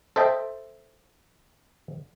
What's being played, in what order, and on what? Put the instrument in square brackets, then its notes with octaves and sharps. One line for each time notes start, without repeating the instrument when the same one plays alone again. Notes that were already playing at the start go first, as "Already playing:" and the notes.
[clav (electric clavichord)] A4 C5 D#5 E5 G5